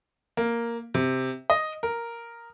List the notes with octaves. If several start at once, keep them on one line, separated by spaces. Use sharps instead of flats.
A#3
C3
D#5
A#4